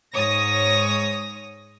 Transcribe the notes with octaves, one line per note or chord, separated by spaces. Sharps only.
G#2 C#5 D#6 A#6